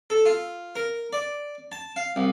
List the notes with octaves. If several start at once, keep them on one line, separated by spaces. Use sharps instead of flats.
A4
F4
A#4
D5
A5
F5
C2